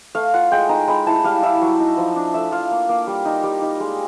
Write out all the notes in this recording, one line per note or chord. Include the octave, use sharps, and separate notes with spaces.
A3 F5
F4 F#5
G#3 G5
D#4 A#5
G#3 B5
E4 A5
G3 F5
E4 E5
F#3
D#4
F3
D4
A3 E5
F4 F5
A#3
A#3
G3
D#4
G3
D#4
G#3